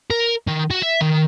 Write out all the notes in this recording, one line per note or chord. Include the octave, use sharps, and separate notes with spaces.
A#4
D#3
F#4
E5
D#3